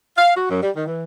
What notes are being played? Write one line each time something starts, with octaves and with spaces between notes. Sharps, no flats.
F5
F#4
F#2
G3
D#3
E3